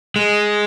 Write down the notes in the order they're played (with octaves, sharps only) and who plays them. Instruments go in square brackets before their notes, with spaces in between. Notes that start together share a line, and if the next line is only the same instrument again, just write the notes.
[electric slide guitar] G#3